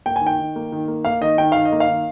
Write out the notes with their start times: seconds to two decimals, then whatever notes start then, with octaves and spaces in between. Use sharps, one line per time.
0.06 A#3 G5
0.16 G#5
0.21 D#3
0.26 G5
0.39 D#3
0.56 A#3
0.72 D#3
0.88 A#3
1.05 A#3 F5
1.21 D#3 D#5
1.38 D#3 G5
1.52 D#3 F5
1.65 D#5
1.72 A#3
1.80 F5
1.89 D#3